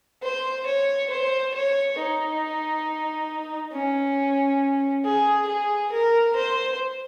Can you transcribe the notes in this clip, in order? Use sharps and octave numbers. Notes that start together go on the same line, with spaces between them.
C5
C#5
C5
C#5
D#4
C#4
G#4
G#4
A#4
C5